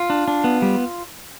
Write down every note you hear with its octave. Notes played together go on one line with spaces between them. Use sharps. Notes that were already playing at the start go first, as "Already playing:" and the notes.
Already playing: F4
D4
D4
B3
G3